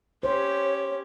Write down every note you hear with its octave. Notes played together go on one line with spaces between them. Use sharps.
C#4 G4 C5 C#5